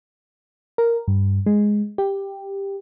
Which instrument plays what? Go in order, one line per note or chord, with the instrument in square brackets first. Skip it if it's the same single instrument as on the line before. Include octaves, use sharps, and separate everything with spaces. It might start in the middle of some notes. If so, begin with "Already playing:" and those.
[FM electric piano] A#4
G2
G#3
G4